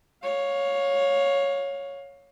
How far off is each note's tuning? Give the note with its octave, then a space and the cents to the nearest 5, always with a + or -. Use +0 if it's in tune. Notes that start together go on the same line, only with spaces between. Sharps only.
C#5 +0 F5 +20